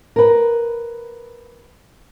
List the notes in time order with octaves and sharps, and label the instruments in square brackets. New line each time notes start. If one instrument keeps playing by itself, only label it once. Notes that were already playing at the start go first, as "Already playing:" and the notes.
[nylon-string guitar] A#4 B4